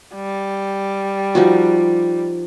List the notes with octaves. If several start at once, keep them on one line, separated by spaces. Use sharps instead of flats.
G3
F3 D#4 F#4